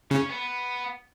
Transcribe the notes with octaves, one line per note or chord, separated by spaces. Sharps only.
C#3 C#4
B3